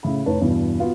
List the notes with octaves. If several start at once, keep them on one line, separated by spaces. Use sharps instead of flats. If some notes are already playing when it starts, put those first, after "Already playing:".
A2 C#3 E5 B5
F1 A2 D#4 B4 C#5 A5
E2 G2 B2 E3
B3 F4 F#4